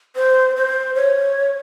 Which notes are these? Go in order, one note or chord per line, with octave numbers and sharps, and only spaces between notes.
C5
C5
C#5